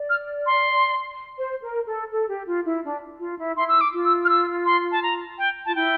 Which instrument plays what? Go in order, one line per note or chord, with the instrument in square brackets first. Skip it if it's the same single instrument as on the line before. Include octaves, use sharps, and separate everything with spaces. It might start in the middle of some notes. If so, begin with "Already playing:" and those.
Already playing: [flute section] D5
[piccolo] F6
C6
[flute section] C5
A#4
A4
A4
G4
F4
E4
D4
F4
E4
[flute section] E4 [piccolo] C6
[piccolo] E6
D6
[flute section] F4
[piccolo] E6
F6
E6
C6
A5
A#5
G5
[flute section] F4 [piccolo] A5
[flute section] E4 [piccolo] G5